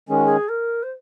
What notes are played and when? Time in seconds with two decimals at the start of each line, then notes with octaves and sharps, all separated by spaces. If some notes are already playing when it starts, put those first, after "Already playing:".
0.09 D#3 G#3 C#4 G#4
0.17 F#4
0.25 G#4
0.49 A#4
0.83 C5